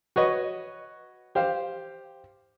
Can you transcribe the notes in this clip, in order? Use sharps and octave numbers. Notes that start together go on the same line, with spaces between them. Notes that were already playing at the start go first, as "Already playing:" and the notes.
F#4 B4 C#5 D#5
G4 C5 F5